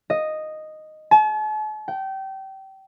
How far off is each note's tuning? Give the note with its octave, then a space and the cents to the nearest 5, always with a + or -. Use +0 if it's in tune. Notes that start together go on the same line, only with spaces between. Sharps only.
D#5 -5
A5 -45
G5 -25